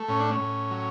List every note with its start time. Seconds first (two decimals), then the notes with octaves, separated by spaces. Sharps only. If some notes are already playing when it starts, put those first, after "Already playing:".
Already playing: A3
0.08 A2 C#4
0.20 D4
0.31 C#4
0.40 A2
0.71 F#3